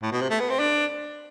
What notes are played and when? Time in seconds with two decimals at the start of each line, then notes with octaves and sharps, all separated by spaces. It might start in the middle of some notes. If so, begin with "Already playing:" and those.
0.02 A2
0.12 B2
0.21 C3
0.30 A3
0.40 B3
0.50 C4
0.59 D4